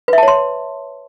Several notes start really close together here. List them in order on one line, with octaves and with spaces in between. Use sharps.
B4 E5 A5 C#5 C6